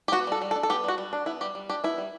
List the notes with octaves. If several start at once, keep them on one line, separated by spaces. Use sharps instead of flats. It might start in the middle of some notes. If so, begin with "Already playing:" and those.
G4
B3 F#4
G3 A4
G3
A4
D4
A4
B3 G4
G3 F#4
G3
D4
B3 E4
G3 G4
G3
D4 G4
B3 E4
G3